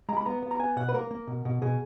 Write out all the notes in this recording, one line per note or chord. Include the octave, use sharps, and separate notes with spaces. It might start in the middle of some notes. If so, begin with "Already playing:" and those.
G#3 A#5
B5
B3 A#5
B3
A#5
B3 G#5
B2 F#5
B4
A#3 A#4
A#3
B2
B2
B2 G#4